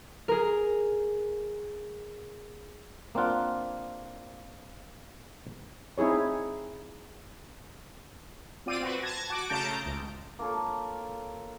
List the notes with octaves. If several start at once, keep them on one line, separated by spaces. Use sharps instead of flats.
G#4 A#4
A#3 C4 D4 F4 F#5
C4 D#4 E4 G#4 C#5
C4 F4 D5 D#7
C4 F#4 B4
A5 G#6 A#6
F#4 D6
C#3 A3 A5 A#5 G6 D7
C#2
A#3 F4 A4 C#5